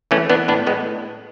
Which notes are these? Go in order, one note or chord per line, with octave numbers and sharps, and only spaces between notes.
E3 A3 C#4
E3 B3 D4
A2 B3 D4
A2 G#3 B3